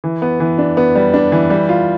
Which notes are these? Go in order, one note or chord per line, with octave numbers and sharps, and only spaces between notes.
E3
B3
E3
D4
B3
G3
D4
E3
G3
F4